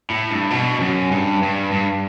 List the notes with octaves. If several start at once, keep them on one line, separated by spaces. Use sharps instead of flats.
A2
G2
B2
F#2
G2
G2
G2